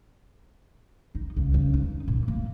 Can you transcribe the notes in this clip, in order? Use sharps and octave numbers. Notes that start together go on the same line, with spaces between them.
D#4
C#2
C#2
D#4
A#2
A#3